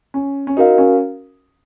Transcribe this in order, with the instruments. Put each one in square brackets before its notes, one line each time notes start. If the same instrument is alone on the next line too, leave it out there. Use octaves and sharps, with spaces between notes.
[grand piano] C#4
C#4
[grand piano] D#4 [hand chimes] F#4 A#4 F5
[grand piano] C#4